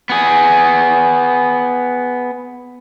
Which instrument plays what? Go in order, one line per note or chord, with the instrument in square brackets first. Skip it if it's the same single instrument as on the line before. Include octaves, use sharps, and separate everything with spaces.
[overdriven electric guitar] B3 G#4